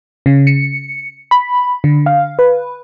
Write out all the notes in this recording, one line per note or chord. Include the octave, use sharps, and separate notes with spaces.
C#3
C#7
B5
D3
F5
B4